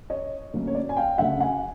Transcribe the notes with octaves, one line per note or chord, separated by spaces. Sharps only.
C#5 D#5
D2 D3 F#3 A#3 C#4
C#5
D5
G#5
F5 G5
D2 C#3 F#3 E5 F#5
F#5 G#5